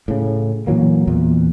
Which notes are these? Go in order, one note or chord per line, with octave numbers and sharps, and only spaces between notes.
A2 C#3
A#2 E3 F#3 A#3
E2 A#2